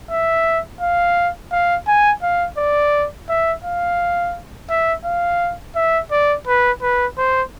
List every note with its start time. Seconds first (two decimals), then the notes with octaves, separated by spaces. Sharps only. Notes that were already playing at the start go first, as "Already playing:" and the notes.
0.10 E5
0.81 F5
1.52 F5
1.87 G#5
2.22 F5
2.57 D5
3.29 E5
3.64 F5
4.69 E5
5.05 F5
5.76 E5
6.11 D5
6.47 B4
6.82 B4
7.18 C5